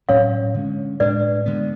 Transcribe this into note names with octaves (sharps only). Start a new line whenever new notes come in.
A2 F#3 C#4 C#5 F5
D3 G#3 C#4
A2 G#3 D4 B4 D5
D3 G#3 B3